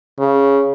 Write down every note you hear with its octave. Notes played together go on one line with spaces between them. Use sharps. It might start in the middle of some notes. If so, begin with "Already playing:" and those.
C#3